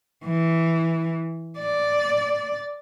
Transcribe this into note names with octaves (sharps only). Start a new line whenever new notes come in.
E3
D5